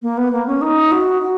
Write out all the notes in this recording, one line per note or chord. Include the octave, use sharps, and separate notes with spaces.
A#3
B3
A#3
C#4
D#4
F#4
F#4